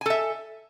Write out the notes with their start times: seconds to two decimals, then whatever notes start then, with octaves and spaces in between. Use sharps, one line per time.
0.01 G#5
0.06 A4
0.10 E5